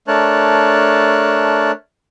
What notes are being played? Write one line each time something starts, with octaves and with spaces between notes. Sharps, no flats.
A3 D4 A#4 C#5 A5 F#6